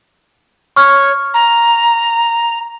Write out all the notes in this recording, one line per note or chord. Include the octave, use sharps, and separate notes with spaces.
C#5 C#6 F6
A#5